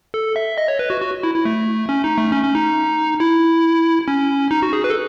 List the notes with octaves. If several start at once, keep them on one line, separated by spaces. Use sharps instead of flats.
A4
E5
D#5
C#5
B4
F#4
F#4
E4
E4
A3
C#4
D#4
A3
C#4
C#4
D#4
E4
C#4
D#4
F#4
G#4
B4
A4